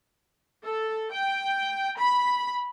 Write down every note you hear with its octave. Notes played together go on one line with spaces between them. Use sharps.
A4
G5
B5